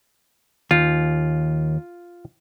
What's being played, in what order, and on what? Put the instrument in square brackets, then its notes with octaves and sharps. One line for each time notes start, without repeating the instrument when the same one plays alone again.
[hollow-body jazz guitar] D#2 [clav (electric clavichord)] F4